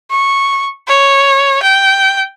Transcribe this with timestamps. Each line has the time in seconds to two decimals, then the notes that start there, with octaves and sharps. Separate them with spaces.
0.11 C#6
0.88 C#5
1.63 G5